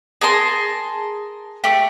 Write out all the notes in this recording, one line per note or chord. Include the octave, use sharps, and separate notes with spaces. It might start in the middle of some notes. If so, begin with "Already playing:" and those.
G#4 A#4 A5 C6
A3 G4